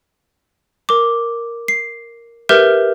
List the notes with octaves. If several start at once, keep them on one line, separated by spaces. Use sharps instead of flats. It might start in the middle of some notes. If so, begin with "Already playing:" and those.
A#4 D6
C7
G4 A#4 B4 E5 F6 G6